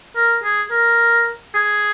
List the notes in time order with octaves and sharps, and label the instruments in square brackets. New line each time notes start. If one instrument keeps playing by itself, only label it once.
[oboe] A#4
G#4
A#4
G#4